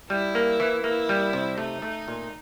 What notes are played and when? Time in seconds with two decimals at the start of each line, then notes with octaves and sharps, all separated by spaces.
0.10 G3 E4
0.35 A#3
0.60 E3
0.84 A#3 E4
1.09 G3
1.33 C3
1.58 A3 D#4
1.82 A3
2.08 A#2